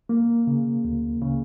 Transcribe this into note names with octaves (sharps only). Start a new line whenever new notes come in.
A#3
C#3
D2
C#3